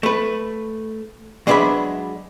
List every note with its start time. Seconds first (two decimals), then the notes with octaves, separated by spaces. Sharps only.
0.03 A3 B4
1.47 F#3 G#3 D4 B4 E5 B5